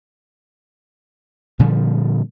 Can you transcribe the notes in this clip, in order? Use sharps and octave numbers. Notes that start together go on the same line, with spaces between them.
A#2 D3 F3 G3